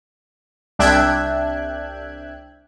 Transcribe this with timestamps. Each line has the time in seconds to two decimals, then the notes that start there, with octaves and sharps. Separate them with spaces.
0.79 C2 D4 E5 G5 F#6 G#6